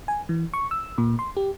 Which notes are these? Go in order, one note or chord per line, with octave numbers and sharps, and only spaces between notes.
G#5
E3
C#6
E6
A#2
C6
G4